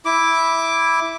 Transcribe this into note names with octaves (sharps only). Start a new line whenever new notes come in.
E4 D6